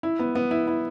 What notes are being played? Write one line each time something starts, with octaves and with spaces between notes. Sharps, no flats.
E4
B3
B3
E4
E4